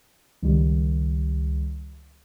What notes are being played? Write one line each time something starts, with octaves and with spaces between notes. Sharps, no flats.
C#2 D#3 G3